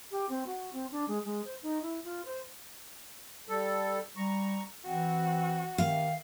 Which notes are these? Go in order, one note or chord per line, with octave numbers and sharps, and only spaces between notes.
G4
C4
F#4
C4
D4
G#3
G#3
C5
D#4
E4
F4
C5
G3 A4
G3 A#5 C#6
E3 C4 F#4
C3 D#3 F5